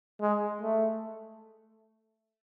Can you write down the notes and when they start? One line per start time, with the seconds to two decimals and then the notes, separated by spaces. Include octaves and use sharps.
0.21 G#3
0.62 A3